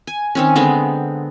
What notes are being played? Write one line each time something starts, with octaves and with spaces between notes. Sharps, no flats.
G#5
D#3 C4 C#4
D3 G#3 B3 C4